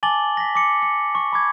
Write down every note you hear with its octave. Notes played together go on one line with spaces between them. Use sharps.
G#5 A5 D6 A6 F#7 G7
A#6 B6
D6 C#7
C#7
C#6
B5 D6 G#6